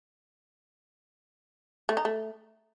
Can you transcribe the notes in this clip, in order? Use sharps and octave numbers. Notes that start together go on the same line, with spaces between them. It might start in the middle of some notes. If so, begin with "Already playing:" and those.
A3
D#4
A3